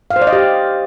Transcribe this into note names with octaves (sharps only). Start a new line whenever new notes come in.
F5
C5
D5
D#5
G4